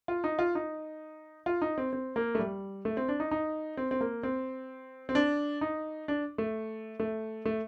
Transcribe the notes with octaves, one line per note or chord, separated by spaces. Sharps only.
F4
D#4
F4
D#4
F4
D#4
C4
C4
A#3
A3
G3
A3
C4
D4
D#4
D#4
C4
C4
A#3
C4
C4
D4
D#4
D4
A3
A3
A3